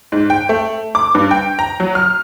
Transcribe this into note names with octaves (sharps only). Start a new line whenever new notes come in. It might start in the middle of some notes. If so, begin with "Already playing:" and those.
G#2
G5
A3
D6
G2
G5
A#5
F#3
F6